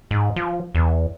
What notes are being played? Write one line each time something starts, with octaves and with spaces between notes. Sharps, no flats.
G#2
F3
E2